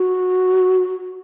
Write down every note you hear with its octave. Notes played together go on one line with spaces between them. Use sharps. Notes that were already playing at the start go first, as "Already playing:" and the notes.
Already playing: F#4